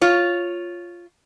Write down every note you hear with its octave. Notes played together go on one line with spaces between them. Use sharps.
F4 C#5